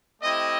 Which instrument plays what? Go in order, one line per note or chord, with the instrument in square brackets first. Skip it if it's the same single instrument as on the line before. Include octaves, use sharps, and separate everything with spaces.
[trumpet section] A3 C4 E4 G4 D#5